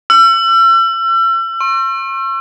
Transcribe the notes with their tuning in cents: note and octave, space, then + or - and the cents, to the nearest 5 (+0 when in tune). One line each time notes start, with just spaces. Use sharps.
E6 +40
C#6 -40